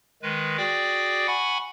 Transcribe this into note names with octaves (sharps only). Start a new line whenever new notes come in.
D#3 G#3 B4
F#4 G#4 D5 G5 D6
F#5 G#5 B5 C#6